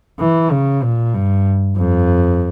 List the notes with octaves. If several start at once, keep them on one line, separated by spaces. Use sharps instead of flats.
E3
C#3
A#2
G2
F2